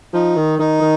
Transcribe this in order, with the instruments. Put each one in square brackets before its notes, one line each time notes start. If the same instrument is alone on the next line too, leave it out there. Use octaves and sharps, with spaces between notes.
[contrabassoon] F3 [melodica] D#4
[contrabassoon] D#3
[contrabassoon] D#3 [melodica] D#4
[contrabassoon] D#3